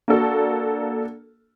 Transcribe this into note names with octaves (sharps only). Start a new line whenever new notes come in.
A#3 D4 F#4 A4